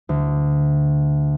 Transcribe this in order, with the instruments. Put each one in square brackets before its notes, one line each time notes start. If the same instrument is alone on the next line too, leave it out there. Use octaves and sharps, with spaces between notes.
[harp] D2